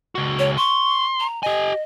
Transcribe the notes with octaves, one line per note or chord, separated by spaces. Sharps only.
C#2 F#4
C#5
C6 C#6
A#5
G4 D#5 G#5